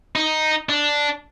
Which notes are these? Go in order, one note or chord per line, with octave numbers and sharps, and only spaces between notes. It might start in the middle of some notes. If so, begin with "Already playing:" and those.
D#4
D4